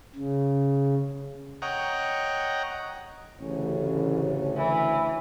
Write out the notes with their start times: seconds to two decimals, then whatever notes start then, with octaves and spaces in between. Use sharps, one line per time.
0.16 C#3
1.62 C#5 D#5 F#5 G5 A#5
3.41 A1 D2 C#3 C#4
4.57 E3